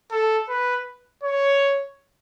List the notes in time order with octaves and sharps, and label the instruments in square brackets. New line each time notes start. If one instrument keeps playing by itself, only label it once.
[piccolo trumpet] A4
B4
C#5